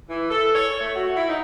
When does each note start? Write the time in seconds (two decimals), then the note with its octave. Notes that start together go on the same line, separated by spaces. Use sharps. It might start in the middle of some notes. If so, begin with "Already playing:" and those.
0.09 E3
0.30 A4
0.54 C#5
0.80 A3
0.95 F#4
1.16 E4
1.28 D#4